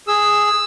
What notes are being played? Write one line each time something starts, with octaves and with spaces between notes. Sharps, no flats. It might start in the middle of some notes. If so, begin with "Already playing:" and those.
G#4 E6